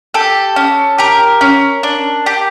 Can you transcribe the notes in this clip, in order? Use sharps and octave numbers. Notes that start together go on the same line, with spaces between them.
G4 A4
C#4
G4 A#4
C#4
D4
G4